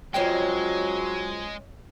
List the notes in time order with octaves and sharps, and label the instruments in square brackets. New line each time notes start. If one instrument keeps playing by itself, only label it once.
[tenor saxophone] F#3 [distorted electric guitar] G#3 [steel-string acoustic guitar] C#4 D5 D#5 [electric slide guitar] F4 C5 G5